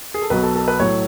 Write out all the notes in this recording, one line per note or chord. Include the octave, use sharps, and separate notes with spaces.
G#4
A4
B1 B2 F#3 B4
A4
A4
B4
A2 F#3 A3 C#5